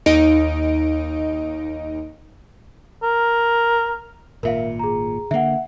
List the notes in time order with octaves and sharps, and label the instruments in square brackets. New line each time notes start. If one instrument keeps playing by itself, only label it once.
[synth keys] D#2 D#4 D#5 D7
[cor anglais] A#4
[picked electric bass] G#1 A#2 [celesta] A#4 E5 F5
[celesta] G#4 A#5
[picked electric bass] D3 A#3 [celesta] E5 F#5